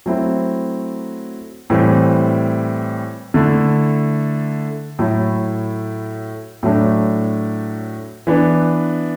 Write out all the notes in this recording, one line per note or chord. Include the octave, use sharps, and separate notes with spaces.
F#3 A3 C4 E4
A2 E3 G3 C4
D3 A3 E4
A2 F#3 A3 E4
A2 F#3 A3 D4
E3 B3 D4